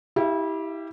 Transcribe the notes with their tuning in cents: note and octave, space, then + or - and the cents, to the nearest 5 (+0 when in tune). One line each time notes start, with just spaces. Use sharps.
E4 -25 G4 +0 E5 +45